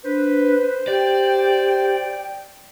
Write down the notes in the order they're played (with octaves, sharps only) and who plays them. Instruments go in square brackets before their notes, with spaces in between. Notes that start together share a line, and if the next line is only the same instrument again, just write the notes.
[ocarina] D4 [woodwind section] B4 [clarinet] C5
[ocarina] G4 [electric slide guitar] D5 [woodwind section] G5